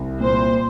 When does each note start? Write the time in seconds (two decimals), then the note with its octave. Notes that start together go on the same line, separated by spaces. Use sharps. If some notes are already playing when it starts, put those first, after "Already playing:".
Already playing: C2
0.20 A#2 C5